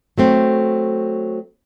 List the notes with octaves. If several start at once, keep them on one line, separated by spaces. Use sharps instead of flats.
F#3 A3 C4